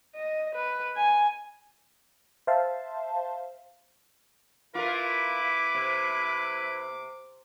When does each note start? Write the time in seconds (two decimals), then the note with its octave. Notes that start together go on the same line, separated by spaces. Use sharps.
0.15 D#5
0.55 B4
0.96 G#5
2.47 C5 E5 F5 A5 C6
4.75 E4 F4 A#4 B4 D6
5.75 C3